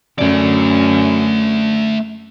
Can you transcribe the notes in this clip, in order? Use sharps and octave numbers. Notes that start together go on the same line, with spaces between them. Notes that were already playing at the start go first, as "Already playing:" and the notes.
F#2 A3 D5